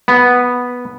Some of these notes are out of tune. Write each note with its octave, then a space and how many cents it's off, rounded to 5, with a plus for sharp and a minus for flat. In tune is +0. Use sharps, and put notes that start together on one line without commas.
B3 -5